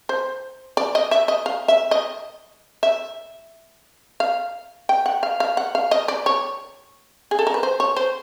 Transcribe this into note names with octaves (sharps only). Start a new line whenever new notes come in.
C5
D5
D#5
E5
D#5
F5
E5
D#5
E5
F5
G5
F#5
F5
F5
F#5
F5
D#5
D5
C#5
G#4
A4
A#4
B4
C5
C#5
C5